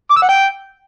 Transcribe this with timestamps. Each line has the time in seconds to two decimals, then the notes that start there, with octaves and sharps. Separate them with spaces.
0.10 D6
0.16 E6
0.22 F#5
0.28 G5